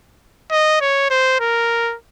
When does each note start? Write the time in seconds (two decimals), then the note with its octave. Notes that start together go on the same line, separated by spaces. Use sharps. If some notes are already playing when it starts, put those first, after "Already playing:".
0.51 D#5
0.81 C#5
1.10 C5
1.40 A#4